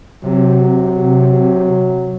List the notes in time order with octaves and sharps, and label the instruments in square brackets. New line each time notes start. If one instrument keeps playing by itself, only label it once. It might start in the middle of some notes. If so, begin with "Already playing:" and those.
[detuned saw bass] C3 [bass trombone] F#3